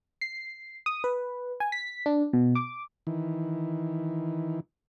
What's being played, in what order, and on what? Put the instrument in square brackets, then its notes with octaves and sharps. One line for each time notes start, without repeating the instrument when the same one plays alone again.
[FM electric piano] C7
D#6
B4
G#5
B6
D4
B2
D6
[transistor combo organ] D#3 E3